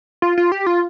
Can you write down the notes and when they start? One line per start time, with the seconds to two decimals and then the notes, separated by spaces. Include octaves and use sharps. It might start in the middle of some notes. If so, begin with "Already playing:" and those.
0.22 F4
0.38 F4
0.52 G4
0.66 F4